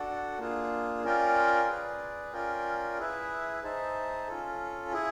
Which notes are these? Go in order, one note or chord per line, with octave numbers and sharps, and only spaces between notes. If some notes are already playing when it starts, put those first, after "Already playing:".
Already playing: D4 F#4 A4 D5 F#5
A#3 D4 F4 G#4
C#4 F4 A#4 D5 G5
G#4 B4 D5
C#4 F4 A#4 D5 G5
E4 G#4 B4 E5
D#4 G#4 C5 E5 A5
C#4 F4 A4
E4 G#4